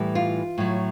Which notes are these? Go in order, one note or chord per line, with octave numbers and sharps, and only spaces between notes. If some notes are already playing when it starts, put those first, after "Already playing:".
Already playing: A2 E3 G3
F4
A2 F#3